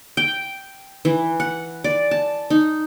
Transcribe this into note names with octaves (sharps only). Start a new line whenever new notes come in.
G5
E3
F#5
D5
A5
D#4